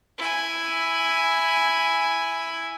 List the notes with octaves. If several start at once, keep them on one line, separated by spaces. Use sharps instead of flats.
E4 G#5